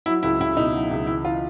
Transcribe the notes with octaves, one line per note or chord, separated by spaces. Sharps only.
F#3 E4
C#2 E4
C#2 E4
B2 D#4
F#3
C#2
E3 E4
F4